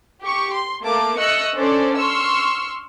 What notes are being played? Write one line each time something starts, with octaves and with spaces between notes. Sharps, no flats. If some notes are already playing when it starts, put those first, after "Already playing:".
G4 C#6
C6
A3 A#3 A5 D6
A3 D#5 C#6 E6 F#6 C#7
C#4 D4 A4 C5 D5
C6 C#6 E6 F6